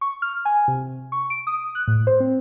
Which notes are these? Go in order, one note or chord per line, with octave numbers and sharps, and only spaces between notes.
C#6
F6
G#5
C3
C#6
D7
D#6
F#6
A2
C5
C4